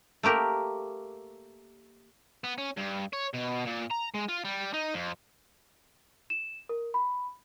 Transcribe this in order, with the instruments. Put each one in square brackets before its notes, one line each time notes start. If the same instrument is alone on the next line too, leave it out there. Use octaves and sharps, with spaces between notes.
[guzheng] A3 A#3 G4 A#4
[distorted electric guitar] B3
C#4
G2
C#5
B2
A#2
A#5
G#3
F4
G3
D#4
F2
[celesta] E7
A#4
B5